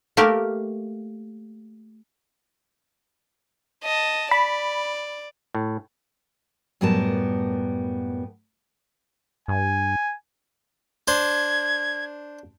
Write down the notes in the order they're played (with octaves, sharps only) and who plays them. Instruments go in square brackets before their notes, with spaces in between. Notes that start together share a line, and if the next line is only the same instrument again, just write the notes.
[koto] A3 A#3 G4 A#4
[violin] D#5 A5
[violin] D5 [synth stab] B5
[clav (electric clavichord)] A2
[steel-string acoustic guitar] F#2 A2 G3 B3 A#4 A5
[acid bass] G2 [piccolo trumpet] G#5
[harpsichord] D4 C5 [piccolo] G#6